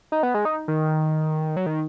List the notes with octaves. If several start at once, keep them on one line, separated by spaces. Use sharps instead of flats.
D#4
B3
G#3
D#4
D#3
F#3
D#3